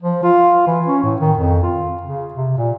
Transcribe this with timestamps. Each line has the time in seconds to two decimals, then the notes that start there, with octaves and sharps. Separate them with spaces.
0.02 F3
0.23 F4
0.67 E3
0.86 C#4
1.04 A2
1.20 D#3
1.37 F2
1.63 F4
2.03 C#3
2.34 C3
2.58 A#2